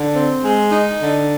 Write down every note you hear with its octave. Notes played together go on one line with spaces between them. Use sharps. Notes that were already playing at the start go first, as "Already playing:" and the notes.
Already playing: D3
C4
G#3
D#4
D3